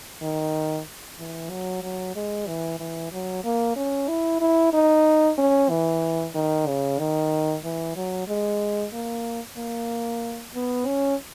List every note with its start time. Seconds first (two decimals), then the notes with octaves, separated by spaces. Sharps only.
0.22 D#3
1.19 E3
1.50 F#3
1.83 F#3
2.15 G#3
2.47 E3
2.79 E3
3.12 F#3
3.44 A#3
3.76 C#4
4.08 E4
4.41 E4
4.73 D#4
5.38 C#4
5.69 E3
6.35 D#3
6.67 C#3
6.98 D#3
7.64 E3
7.96 F#3
8.28 G#3
8.93 A#3
9.57 A#3
10.55 B3
10.86 C#4